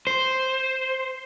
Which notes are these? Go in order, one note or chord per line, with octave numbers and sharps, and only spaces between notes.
C5